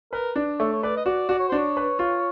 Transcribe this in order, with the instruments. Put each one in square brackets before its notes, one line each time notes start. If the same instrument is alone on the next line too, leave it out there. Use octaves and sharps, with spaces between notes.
[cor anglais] A#4 [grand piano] B4
[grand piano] D4
[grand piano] A3 [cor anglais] C#5
[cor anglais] C#5
[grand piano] B4 [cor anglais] D5
[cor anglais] D#5
[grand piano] F#4 [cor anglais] D5
[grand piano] F#4 [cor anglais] D5
[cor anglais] C#5
[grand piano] D4 [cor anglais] C5
[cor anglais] C#5
[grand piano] B4
F4